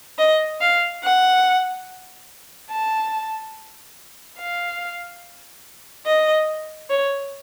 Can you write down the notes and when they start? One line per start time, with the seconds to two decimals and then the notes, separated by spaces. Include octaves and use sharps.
0.19 D#5
0.61 F5
1.03 F#5
2.71 A5
4.38 F5
6.06 D#5
6.90 C#5